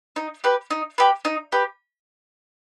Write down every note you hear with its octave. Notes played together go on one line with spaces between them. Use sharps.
D#4
G4 B4
D#4
G4 B4
D#4
G4 B4